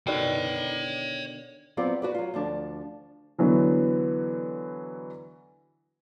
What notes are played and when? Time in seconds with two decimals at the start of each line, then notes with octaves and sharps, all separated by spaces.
0.07 B2 D3 D#3 C#5 G5
1.77 F#3 B3 C4 F4 D5
2.02 F#4 B4 D5
2.15 F#3 F4
2.34 D2 F3 D4
3.38 D3 E3 F#3 B3